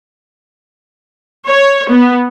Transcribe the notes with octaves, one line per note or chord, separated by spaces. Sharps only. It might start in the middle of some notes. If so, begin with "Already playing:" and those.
C#5
B3